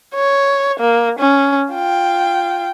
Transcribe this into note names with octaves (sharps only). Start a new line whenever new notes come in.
C#5
A#3
C#4
F4 G5